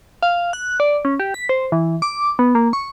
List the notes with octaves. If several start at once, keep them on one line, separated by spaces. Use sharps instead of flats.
F5
F#6
D5
C#4
G4
B6
C5
E3
D6
B3
A#3
C#6